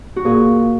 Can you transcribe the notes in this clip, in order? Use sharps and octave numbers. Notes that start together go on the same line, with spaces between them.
F#4
A#2 G#4